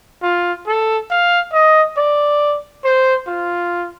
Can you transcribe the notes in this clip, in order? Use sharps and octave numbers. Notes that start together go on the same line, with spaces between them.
F4
A4
F5
D#5
D5
C5
F4